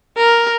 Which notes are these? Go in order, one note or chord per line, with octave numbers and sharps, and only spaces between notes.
A#4